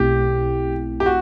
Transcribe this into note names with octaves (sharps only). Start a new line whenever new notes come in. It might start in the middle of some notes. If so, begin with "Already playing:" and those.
Already playing: B1 B2 A3 C4 E4 G4
G4
F#4